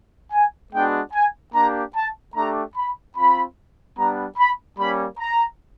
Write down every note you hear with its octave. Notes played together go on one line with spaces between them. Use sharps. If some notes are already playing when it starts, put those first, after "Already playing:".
G#5
G#3 B3 D4 F#4 G5
G#5
A#3 D4 G4 A#5
A5
A3 D4 G4 A#5
B5
C4 F4 B5
G3 B3 D4 A#5
B5
G3 A#3 C#4 B5
A#5